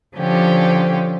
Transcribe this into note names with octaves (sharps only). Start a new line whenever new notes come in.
D3 F3 C#4 G4